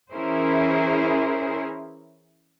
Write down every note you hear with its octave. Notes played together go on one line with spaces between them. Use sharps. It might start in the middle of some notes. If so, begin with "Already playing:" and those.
E3 C#4 E4 G#4 A#4 C5